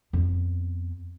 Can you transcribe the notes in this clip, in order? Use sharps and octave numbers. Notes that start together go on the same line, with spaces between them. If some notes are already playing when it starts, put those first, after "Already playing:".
F2 B3